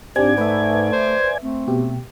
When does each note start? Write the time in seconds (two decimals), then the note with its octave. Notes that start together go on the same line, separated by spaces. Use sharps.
0.16 G#2 C4 D4 G4 D5 G#5 G#6
0.38 A3 B4 E5
0.92 C5
1.42 A3 C4
1.68 B2 G4